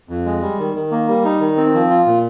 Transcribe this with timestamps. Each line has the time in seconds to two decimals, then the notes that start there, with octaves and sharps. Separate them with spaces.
0.09 F2
0.25 G#3
0.42 G3
0.59 D#3
0.75 D#3
0.91 A#3
1.08 G3
1.24 D#4
1.40 D#3
1.57 C4
1.74 F3
1.90 F4
2.06 A#2